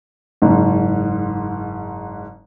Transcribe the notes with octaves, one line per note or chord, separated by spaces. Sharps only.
F#1 G#2